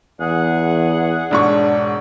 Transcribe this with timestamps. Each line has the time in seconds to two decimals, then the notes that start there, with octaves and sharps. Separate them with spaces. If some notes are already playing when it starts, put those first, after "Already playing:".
0.20 E2 G#4 F#5
1.31 E1 G#2 D4 C#6